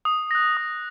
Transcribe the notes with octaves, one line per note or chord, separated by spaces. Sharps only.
D#6
F#6 A#6
D#6